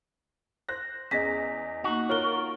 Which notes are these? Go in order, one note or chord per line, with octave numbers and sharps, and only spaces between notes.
C5 F#6 A#6
E2 C#4 G#4 D#5 A#6 B6
A#3 D#4 F#4
F4 A#4 C#5 G7